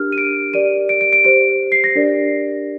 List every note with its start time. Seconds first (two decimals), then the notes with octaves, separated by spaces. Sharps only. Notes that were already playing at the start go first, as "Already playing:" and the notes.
Already playing: D4 G4 A#4 F6
0.12 D#7
0.18 D7
0.54 G4 A#4 D5 D#7
0.89 D7
1.01 D7
1.13 D7
1.25 G4 C5 D7
1.72 C7
1.84 A#6
1.95 D4 G4 A#4 D5